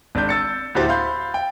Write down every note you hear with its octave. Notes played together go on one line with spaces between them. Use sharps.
G#1 D4 G6
E6 A6 C#7
D2 A2 F#4 G4 C5 A6
F5 B5 C6 G6
G5